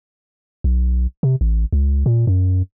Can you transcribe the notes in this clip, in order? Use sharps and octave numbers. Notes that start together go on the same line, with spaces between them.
B1
C3
A1
C#2
A#2
F#2